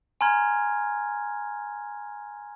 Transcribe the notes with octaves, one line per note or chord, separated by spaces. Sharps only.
G#5 A#5 C6 F6 G#6